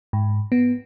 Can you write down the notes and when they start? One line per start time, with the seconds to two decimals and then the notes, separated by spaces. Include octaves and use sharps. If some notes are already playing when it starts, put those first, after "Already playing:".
0.13 G#2
0.52 B3